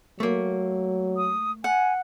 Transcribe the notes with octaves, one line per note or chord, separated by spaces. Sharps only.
F#3 A3 A#3
D#6
F#5 G#5